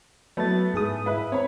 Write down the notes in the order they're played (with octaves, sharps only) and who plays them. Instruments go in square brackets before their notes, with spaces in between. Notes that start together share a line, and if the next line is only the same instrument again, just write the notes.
[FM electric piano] F#3 A6 [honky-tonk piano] A3 B3 E4
[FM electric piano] G#2 G#4 D#6
[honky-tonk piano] E4 B4
[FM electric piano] C4 [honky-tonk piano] C#5 B5